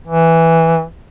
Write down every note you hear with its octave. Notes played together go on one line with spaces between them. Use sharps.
E3